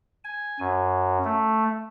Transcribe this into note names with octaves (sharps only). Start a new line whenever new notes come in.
G#5
F#2
A3